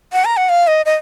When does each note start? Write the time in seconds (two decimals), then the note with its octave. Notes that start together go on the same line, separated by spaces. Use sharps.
0.13 F#5
0.25 A#5
0.37 F#5
0.49 F5
0.67 D#5
0.86 D#5